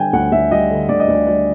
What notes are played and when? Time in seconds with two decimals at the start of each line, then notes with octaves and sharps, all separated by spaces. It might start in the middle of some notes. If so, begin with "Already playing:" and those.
Already playing: D3 G3 G5 G#5
0.13 D2 F#5
0.32 D2 E5
0.51 G3 D#5
0.71 D3
0.89 D2 D5
1.00 D#5
1.08 D2 D5
1.27 G3 D5